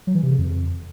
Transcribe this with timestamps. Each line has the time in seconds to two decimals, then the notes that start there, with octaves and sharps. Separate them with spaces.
0.07 F#3
0.15 E3
0.23 C3
0.30 C#3
0.38 F2